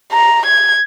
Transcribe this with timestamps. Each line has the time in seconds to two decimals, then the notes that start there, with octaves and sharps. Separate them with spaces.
0.12 A#5
0.46 G#6